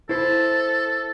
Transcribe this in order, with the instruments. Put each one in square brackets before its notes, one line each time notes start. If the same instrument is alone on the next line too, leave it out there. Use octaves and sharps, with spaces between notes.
[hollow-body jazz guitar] E4 C5 [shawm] A4